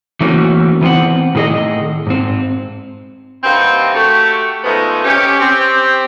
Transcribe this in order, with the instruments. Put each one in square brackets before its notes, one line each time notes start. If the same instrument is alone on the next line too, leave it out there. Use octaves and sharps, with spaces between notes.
[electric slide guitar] E3 A3 A#3 C4 C#4 F#4
E3 B3 C4 C5 F#5
A2 D#3 G#4 A4 D#5
G#2 C4
[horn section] G2 C3 A#3 C4 D#4 F#5
A3 F#4 G4
F3 G#3 A3 B3 D#4
C#4 G4
C4 G4